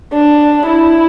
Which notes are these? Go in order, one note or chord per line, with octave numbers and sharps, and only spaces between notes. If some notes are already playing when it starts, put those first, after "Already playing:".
D4
E4